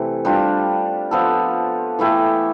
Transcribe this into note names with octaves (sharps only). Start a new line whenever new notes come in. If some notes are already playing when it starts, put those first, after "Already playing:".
Already playing: C3 E3 A3
G3 D4 F4
F3 B3 F4 A4
E3 A3 E4 G4